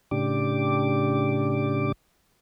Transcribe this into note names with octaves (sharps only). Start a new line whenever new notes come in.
A2 C#3 D4 G4 D6